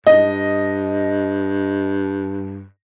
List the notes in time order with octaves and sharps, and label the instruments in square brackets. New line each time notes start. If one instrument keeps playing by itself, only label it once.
[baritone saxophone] G2 [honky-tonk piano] D#5